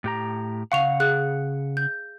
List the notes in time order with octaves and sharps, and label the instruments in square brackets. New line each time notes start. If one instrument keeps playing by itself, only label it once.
[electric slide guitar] A2 G4 A#5
[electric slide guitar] C#3 F#5 [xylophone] F5 C#6 F7
[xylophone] G#4 F#6
G6